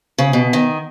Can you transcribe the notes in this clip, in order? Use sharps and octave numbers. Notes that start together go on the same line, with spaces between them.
C#3
B2
D#3